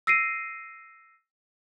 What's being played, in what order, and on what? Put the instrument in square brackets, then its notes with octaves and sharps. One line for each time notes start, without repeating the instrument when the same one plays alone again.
[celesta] E6 A#6 C7 D7 D#7